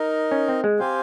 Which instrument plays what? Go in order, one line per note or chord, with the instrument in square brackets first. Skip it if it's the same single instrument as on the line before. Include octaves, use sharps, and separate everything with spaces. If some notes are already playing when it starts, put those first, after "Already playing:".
Already playing: [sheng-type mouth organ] D#4 A#4 D#5
[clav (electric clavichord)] C#4
C4
G#3
[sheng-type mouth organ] C4 G4 C5 F5 G#5